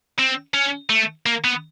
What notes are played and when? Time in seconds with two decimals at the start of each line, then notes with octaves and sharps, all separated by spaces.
0.19 C4
0.54 C#4
0.90 A3
1.26 A#3
1.44 B3